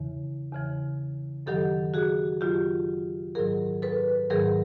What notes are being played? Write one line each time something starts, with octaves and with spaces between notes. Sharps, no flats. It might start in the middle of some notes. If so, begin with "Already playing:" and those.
Already playing: E2 C#3 E3
E2 C#3 E3
F#2 D#3 F#3 G4 A4
F#4 G#4
F#2 D#3 F#3 F4 G4
G#2 D#3 F#3 G#4 A#4
A4 B4
G#2 D#3 F#3 G#4 A#4